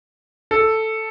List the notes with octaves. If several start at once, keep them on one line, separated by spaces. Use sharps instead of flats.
A4